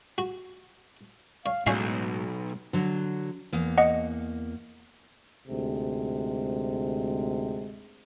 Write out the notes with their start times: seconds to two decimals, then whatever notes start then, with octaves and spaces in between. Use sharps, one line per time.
0.18 F#4
1.46 C#5 F5
1.67 B1 A2 G#3 C#4 F#4 C#5 F5
2.73 D3 F#3
3.53 E2 A#3
3.78 D#5 F#5
5.48 D2 G#2 C3 G#3